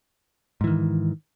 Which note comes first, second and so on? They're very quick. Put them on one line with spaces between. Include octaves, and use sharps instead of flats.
G#2 E3 D#3